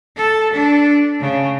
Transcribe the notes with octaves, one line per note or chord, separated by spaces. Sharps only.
A4
D4
C#3